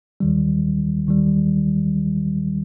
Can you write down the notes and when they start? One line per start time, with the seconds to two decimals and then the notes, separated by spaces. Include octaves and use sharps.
0.20 D#2 D#3 G3
1.07 D#2 D#3 G3